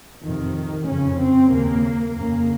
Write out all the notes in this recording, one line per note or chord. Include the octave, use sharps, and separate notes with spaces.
F2 C3 D#3
F2 C#3 C#4
C4
D#2 C#3 A#3
F2 C#3 A#3